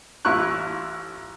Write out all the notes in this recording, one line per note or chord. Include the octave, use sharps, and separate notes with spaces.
A1 E4 F4 C#6 F#6